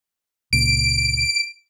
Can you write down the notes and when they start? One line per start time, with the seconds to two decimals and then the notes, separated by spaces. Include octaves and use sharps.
0.53 C#2 A#2 D7